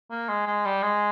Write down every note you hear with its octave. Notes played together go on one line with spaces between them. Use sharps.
A#3
G#3
G#3
G3
G#3